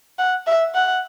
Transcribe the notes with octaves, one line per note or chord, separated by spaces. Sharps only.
F#5
E5
F#5